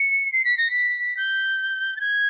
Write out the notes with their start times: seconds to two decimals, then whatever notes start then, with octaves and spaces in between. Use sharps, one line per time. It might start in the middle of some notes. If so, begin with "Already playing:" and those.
Already playing: C#7
0.33 C7
0.45 B6
0.58 A#6
0.71 B6
1.17 G6
1.97 A6
2.01 G#6